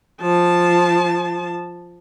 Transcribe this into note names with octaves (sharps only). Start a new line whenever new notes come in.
F3 A5